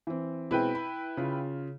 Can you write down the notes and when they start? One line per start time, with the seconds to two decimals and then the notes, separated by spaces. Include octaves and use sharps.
0.07 E3 C4
0.51 B2 G#3 C4 E4 B4 G5
0.75 B5
1.17 C#3 F4